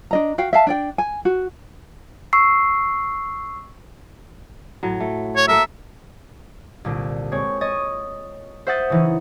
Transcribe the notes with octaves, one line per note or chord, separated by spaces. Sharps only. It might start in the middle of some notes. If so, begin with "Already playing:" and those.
D4 D#5 A#5
F#4 F5 G5
E5 F5 A5
D4 D5 G5
G#5
F#4
C#6 E6 C7
A2 F#3
A3
C#5
A#3 A4 A#4 E5
C2 A#2 D3
G#3 C4 C#5
C#5 D#5 D#6 A6
C5 E5 F#5 D#6 A6
C#3 E3 D#4